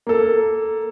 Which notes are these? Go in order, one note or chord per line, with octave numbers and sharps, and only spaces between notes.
A#3 A4